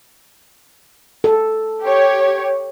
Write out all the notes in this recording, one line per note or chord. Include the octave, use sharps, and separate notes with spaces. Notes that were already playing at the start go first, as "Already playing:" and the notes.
A4
G4 C#5